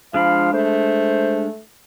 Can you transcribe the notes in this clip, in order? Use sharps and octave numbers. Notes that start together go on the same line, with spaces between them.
F3 G#3 D4 F5 B5
A3 C5